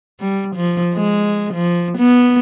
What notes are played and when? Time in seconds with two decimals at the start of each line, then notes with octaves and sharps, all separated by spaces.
0.20 G3
0.56 F3
0.95 G#3
1.54 F3
1.98 B3